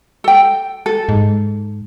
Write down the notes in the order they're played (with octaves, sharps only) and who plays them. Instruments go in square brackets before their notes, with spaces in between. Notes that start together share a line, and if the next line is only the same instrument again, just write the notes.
[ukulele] A4 G5
A4
[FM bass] G#2